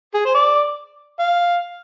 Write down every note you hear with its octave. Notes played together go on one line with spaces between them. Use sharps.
G#4
C5
D5
F5